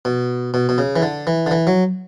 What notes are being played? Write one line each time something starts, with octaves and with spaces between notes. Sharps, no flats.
B2
B2
B2
C#3
E3
D3
E3
D3
E3
F#3